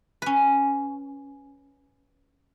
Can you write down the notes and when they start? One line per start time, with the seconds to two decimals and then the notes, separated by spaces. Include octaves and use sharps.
0.22 C#4 B4